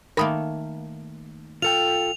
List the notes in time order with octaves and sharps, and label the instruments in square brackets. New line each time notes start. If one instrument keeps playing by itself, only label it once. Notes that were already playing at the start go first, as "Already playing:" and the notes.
[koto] D#3 A3 A#3 [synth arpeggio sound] A#4 B5 D#6
[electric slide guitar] F4 A4 G5 [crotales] F7